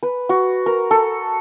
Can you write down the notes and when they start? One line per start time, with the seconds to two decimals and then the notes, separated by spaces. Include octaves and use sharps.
0.03 B4
0.29 F#4
0.66 A#4
0.91 A4